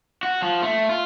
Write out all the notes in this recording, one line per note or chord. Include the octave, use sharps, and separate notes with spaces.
F#4
F3
A3
F4